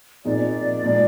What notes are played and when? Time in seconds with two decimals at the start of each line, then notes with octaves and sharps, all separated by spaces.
0.25 A#2 F3 C4 D#4 G#4 D5
0.83 A#2 F3 G#3